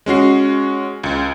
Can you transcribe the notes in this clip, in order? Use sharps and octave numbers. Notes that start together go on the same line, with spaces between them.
G#3 C#4 F#4 C7
C#2